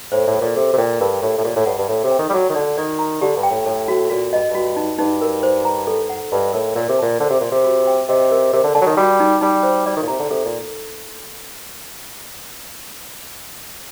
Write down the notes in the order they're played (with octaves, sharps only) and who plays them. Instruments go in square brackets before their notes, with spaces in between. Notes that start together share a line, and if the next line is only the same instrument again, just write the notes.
[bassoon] A2 [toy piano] C5
[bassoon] A2
[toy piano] A4
[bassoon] A#2
[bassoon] C3 [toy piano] A4
[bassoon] C3
[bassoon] A#2 [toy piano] G5
[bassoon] G2 [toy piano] A#4
[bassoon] A2 [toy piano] G4
[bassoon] A2
[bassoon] A#2 [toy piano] G4
[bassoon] A2
[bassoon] G2 [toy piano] F#5
[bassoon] G2
[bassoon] A2 [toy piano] A4
[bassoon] C3
[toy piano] G5
[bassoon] D#3
G3
[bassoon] F#3 [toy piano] F#4
[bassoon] D#3
[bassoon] D3 [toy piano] D5
[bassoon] D#3 [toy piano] D5
[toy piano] A#5
[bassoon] D3 [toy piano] G4
[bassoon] G2
[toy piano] G5
[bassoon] A2
[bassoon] A2 [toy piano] A4
[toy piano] F#4
[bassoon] A#2 [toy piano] F#4
[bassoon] G2 [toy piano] D#5
[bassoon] G2
[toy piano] F#4
D#4
[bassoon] G2 [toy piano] D#4
[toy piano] A#4
C5
A#5
A4
F#5
[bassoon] G2 [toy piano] D#5
[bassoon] A2 [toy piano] A#4
[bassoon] A#2 [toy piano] A#4
[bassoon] C3
[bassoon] A#2 [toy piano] A5
[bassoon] D3 [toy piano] C5
[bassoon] C3
[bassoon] A#2 [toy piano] C6
[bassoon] C3
[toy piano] F#4
G5
[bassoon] C3 [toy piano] D#5
[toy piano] A#4
[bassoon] C3 [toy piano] A#4
[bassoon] D3
[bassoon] D3 [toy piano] A5
[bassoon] F#3
D#3
[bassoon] G3 [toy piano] F#4
[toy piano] D#4
[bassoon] G3 [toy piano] D#4
[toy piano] C5
[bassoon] G3 [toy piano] D5
[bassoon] D#3
A#2
[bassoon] C3 [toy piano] A#5
[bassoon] D3
[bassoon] C3 [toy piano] A4
[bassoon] A#2